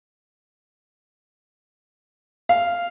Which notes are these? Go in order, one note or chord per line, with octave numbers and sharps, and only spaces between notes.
F5